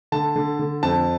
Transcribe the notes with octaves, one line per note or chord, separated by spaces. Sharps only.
D3 A5
D3
D3
F2 A5